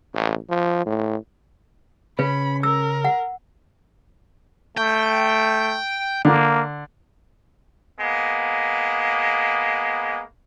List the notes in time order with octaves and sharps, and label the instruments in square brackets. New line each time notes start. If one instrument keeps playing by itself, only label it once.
[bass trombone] A1
F3
A2
[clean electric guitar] C#3 C#4 [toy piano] B4 [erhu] B5
[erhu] A#4 [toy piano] E6
[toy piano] F#5
[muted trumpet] A3 [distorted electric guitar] G5
[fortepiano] D3 [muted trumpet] A#3
[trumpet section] G#3 A#3 B3